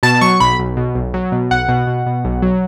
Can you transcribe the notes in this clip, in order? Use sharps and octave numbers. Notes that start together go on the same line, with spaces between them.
B2 A5
F#3 C#6
B1 B5
B1
B2
B1
F#3
B2
B1 F#5
B2
B2
B2
B1
F#3